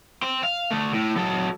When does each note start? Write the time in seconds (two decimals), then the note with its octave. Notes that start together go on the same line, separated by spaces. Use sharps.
0.23 G5 C6
0.43 F5
0.71 D3 A3
0.94 A2
1.16 F#3 A4